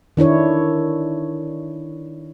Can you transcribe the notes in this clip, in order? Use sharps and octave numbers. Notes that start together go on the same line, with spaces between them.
D#3 D4 E4 C#5